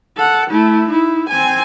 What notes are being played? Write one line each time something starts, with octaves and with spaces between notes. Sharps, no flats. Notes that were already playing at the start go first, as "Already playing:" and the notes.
A4 F#5
A3 E4
D#4 E4
C4 G#5